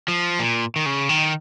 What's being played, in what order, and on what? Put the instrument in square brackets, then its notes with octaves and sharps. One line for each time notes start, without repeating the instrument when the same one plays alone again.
[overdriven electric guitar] F3
A#2
D#3
C#3
D#3